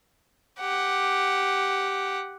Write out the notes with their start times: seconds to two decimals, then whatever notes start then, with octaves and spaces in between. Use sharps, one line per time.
0.60 G4 F#5